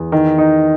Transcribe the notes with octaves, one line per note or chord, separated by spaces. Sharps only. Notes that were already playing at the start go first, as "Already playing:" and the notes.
Already playing: E2
D#3
D#4